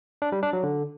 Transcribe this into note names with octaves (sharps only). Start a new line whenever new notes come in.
D4
G3
D4
F#3
D3